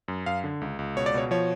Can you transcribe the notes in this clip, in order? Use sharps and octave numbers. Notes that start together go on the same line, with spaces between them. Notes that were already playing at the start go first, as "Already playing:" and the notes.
F#2
F#2 F5
D3
C#2
C#2
B2 C#5
D5
B2 C#5
F3 C#5